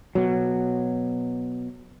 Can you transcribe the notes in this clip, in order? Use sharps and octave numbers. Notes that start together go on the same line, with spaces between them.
B2 F#3